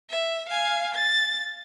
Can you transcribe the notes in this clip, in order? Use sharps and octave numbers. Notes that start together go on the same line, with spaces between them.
E5
F5 G#5
A6